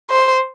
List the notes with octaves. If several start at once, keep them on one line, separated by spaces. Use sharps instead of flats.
C5